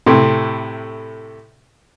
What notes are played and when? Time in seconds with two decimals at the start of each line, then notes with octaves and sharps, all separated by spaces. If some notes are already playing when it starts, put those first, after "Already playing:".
0.06 A2 C3